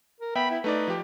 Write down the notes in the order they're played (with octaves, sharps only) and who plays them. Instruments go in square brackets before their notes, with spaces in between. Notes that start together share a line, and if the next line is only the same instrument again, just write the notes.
[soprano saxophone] A#4
[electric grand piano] B3 E5 G5 [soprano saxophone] B5
[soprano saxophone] E4
[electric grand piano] A3 D#4 D5 [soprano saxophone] B4
[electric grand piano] F3 G4